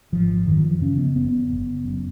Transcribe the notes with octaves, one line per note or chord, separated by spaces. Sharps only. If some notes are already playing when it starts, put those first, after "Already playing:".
G#1 F3
F#2 D#3
F3
C#3 C#4
B3
F#1 B3
F#1
F#2